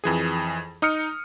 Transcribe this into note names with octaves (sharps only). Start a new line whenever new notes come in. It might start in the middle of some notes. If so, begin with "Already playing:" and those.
F2 E3 G#4
D#4 D#6 F6 C#7